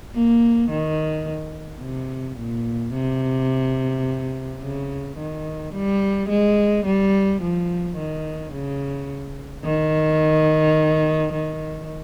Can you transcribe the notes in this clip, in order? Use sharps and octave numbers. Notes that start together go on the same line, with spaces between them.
A#3
D#3
C3
A#2
C3
C#3
D#3
G3
G#3
G3
F3
D#3
C#3
D#3
D#3